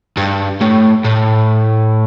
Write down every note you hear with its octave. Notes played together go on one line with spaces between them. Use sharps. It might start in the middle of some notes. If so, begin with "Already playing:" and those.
G2
A2
A2